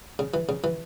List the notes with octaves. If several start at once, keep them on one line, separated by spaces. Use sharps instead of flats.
C#3
E3
C#3
E3